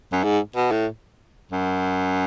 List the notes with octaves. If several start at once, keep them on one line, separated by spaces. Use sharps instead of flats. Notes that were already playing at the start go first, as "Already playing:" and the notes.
F#2
G#2
B2
A2
F#2